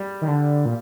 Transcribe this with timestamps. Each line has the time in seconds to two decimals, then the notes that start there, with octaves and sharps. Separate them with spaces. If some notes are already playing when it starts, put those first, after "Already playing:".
Already playing: G3
0.21 D#3
0.28 D3
0.66 A#2